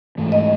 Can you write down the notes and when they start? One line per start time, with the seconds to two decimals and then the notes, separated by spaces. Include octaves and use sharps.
0.18 G#2 E3 A3
0.32 D#5